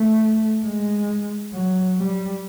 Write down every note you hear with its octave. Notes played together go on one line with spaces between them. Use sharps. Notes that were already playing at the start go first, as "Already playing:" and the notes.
Already playing: A3
G#3
F#3
G3